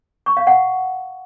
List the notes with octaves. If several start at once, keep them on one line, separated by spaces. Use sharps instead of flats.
C#6
F5
F#5